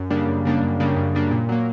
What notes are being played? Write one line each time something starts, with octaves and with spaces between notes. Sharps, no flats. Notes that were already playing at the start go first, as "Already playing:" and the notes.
Already playing: F#2
C#3 G3 A#3 D4
F#2
C#3 G3 A#3 D4
F#2
C#3 G3 A#3 D4
F#2
C#3 G3 A#3 D4
A#2
F#3 A#3